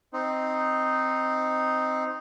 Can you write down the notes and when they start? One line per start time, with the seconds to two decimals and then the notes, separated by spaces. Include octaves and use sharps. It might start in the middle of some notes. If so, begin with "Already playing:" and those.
0.13 C4 D#4